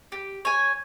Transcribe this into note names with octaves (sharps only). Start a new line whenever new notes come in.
G4
C#5 G#5